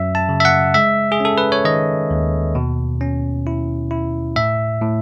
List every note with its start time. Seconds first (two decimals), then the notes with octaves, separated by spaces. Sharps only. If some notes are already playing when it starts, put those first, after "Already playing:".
Already playing: F#2 F#3 C#4 E5
0.15 A5
0.29 C#3
0.40 E5
0.45 F#5
0.74 G#3 E5
1.12 G#4
1.20 C#4 A4
1.38 B4
1.52 C#5
1.65 D#3 D#5
2.11 D#2
2.55 B2
3.01 C#4
3.47 E4
3.91 E4
4.36 A2 E5
4.81 A2